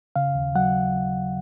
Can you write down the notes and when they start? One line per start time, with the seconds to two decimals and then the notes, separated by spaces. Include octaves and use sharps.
0.16 C#3 F5
0.35 D#2
0.55 F#3 F#5